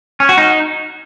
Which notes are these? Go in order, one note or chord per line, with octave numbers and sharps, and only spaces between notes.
C#4
F#4
D#4